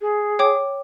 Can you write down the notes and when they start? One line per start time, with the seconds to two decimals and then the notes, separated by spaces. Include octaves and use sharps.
0.01 G#4
0.39 C#5 G5 D6